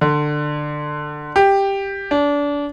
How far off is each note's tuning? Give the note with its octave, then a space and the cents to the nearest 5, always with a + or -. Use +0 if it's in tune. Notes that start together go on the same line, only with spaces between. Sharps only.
D3 +20
G4 +5
D4 -30